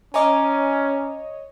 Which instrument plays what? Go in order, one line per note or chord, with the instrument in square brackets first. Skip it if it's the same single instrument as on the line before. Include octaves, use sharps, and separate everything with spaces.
[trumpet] C#4 [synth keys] C#5 D#5 [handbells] G#5 A#5 D6